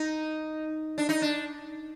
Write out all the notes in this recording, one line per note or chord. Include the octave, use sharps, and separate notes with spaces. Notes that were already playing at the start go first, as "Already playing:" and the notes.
Already playing: D#4
D4
D#4
D4